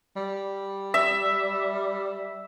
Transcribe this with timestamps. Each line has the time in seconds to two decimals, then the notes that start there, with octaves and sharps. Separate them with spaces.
0.16 G3
0.94 E5